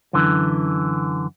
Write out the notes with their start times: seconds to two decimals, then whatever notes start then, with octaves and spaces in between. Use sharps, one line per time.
0.13 F#2 D3 E3